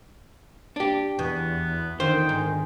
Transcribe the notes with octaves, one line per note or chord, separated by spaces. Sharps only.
D4 G4
E2 B2 B3
D3 D#3 F4 C5 G5
G#2